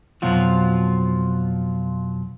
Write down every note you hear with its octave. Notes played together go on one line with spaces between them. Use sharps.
F2 B2 F3 F#3 F4 F#4